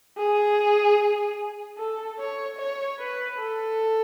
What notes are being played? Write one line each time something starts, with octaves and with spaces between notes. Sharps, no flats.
G#4
A4
C#5
C#5
B4
A4